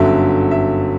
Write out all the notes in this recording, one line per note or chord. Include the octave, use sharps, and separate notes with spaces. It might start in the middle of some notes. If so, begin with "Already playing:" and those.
Already playing: G1 F#2 D3 F#3 E5
E5